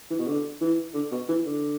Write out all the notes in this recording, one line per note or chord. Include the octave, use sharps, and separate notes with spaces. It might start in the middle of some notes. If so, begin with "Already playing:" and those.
E3
B2
D3
E3
D3
B2
E3
D3